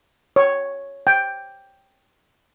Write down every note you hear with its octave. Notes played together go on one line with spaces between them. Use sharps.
C#5
G5